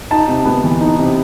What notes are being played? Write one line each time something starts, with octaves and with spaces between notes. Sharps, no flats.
D#4 A5
C3
B3
E3
D#4
C3